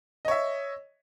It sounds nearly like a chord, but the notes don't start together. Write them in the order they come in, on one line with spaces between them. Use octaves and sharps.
D#5 C#5 E5